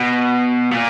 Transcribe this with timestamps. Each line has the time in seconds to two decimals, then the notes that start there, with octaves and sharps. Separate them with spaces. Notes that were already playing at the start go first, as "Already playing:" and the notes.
Already playing: B2
0.72 A#2